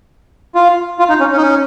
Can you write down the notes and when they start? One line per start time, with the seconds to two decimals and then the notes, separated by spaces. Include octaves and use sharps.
0.55 F4
0.99 F4
1.09 D#4
1.20 C#4
1.32 C#4
1.37 D#4
1.42 C#4